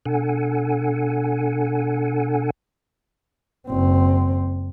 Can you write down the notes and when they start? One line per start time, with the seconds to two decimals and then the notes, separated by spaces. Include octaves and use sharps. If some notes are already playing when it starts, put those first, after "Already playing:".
0.06 B2 D4 A4 F#5 G#5
3.68 F#1 C4